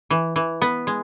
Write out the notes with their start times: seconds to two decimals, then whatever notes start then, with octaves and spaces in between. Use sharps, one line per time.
0.10 E3
0.36 E3
0.62 B3
0.87 G#3